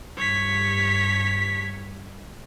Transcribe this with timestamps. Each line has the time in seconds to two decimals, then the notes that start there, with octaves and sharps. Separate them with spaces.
0.17 G2 C#5 B6